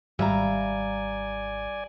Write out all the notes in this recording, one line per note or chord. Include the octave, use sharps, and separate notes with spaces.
G#1 G3 D5 E5 F5 G#5 A#5